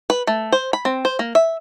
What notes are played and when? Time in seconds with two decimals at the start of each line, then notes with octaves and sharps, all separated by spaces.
0.10 B4
0.27 A3
0.52 C5
0.73 B5
0.85 C4
1.05 C5
1.19 A#3
1.35 E5